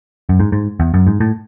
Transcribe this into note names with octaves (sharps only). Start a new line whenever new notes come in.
F#2
G#2
G#2
E2
F#2
G#2
A2